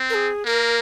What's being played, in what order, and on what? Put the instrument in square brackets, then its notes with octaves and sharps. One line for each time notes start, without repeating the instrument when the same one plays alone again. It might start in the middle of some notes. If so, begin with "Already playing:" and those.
Already playing: [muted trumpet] C4
[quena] A#4
G#4
[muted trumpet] A#3 [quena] A#4